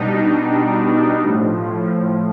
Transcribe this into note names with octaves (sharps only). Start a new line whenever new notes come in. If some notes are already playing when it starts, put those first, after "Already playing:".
Already playing: B2 G3 D4 D#4
D4
A2 F3